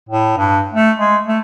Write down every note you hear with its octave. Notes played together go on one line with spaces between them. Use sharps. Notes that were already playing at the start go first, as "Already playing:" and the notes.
A2
G2
A3
G#3
A3